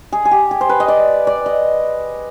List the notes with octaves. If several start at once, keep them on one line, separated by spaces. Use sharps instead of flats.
G#4
G#4
G4
G#4
C5
B4
D#5
D5
D5
D#5